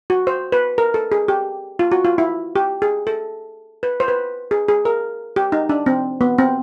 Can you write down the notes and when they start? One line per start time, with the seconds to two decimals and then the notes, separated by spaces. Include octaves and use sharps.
0.10 F#4
0.27 C5
0.52 B4
0.78 A#4
0.94 A4
1.12 G#4
1.28 G4
1.79 F4
1.92 F#4
2.05 F4
2.18 E4
2.56 G4
2.82 G#4
3.07 A4
3.83 B4
4.00 C5
4.08 B4
4.51 G#4
4.68 G#4
4.85 A#4
5.36 G4
5.52 D#4
5.69 D4
5.86 C4
6.21 B3
6.38 C4